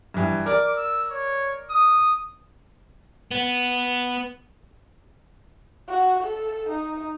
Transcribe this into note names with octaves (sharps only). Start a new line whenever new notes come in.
G2 E3
A#4 D5 D6
E6
C#5
D#6
B3
F#4
A4
D#4